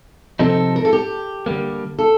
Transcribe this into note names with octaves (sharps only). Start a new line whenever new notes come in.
C3 F3 C4 D#4 A4
A#4
A4
G4
D3 G3 A#3
A4